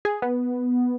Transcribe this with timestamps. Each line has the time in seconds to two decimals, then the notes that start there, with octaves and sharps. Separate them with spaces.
0.05 G#4
0.22 B3